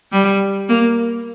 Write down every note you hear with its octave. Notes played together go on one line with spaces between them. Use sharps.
G3
A#3